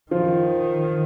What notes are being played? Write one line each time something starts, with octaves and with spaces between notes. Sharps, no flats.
D#3 F3 F4